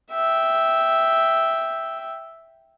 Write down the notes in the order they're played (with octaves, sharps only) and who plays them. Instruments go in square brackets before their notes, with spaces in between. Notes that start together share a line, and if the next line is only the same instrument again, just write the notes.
[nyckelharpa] E5 G5